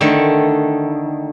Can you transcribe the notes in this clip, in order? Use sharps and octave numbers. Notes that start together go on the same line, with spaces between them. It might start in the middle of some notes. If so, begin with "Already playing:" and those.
D3 D#3 A3